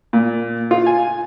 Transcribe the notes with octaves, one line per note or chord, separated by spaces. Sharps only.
A#2
F4
G#5